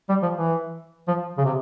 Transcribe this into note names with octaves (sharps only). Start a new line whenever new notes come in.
G3
F3
E3
F3
C#3
C3